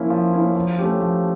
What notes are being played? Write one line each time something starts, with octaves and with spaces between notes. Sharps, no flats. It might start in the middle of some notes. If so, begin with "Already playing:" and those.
Already playing: F3 A#3 C#4 E4
F3
A#3 C#4 E4
F3
A3 C#4 G4
F3